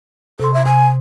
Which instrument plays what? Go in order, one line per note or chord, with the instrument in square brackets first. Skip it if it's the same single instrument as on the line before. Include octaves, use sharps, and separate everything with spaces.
[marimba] C3 C6 [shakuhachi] A4
[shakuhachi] E5
[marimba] C3 [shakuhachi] G#5